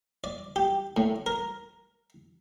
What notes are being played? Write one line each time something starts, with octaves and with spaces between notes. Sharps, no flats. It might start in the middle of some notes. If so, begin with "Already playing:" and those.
D5
G4
A2
A#4